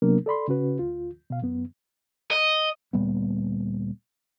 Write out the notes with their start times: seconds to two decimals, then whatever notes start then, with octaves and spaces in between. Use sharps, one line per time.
0.02 C3 F#3 A#3 B3 D4 A#4
0.26 A4 D5 B5 C6
0.48 C#3 C#4 F#4 B4
0.79 D2 F4
1.30 B2 F5
1.42 F#2 B3
2.31 D#5
2.93 D2 A#2 G3 B3